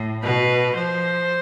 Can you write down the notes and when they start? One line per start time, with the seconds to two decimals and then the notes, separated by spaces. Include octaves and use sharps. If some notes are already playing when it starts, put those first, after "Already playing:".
Already playing: A2
0.23 B2 B4
0.75 F3 C5